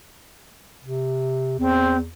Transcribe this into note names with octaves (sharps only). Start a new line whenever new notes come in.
C3
E2 C4